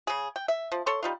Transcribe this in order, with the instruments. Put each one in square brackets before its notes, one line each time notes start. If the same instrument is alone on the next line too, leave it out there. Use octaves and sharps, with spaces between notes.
[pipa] C#3 G#4
G5
E5
F3
A4 C#5 C6
G3 D#4 F4